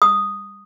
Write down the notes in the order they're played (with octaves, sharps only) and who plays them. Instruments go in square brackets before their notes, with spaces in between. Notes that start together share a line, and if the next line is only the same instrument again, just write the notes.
[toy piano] D#6